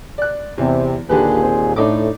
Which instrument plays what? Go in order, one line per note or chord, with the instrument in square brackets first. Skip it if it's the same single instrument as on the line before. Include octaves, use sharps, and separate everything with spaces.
[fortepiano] D5 F#6
[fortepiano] E2 [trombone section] C3
[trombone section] D#2 A#2 G#4 [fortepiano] D3 G4 B4
[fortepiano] C4
[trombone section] A2 [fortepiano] D4 D#4 D6